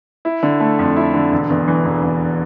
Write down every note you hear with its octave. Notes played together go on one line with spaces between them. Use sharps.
E4
D3
A3
F2
E4
D3
E1
E2
E3
E1
E1